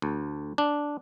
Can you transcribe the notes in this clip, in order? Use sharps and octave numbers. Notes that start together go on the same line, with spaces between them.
D2
D4